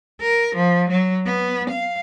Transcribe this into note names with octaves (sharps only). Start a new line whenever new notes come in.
A#4
F3
F#3
B3
F5